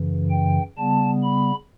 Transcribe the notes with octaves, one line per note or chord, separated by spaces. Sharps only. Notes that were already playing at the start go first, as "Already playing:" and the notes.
Already playing: F#2 C#3 E3
G5
C#3 G3 B3 A5
B5